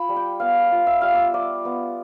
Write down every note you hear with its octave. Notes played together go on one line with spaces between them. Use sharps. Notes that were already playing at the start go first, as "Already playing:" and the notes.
Already playing: F4 B5
G3
G5
B3 F5
F4
E5
G3 F5
E5
F4 D5
B3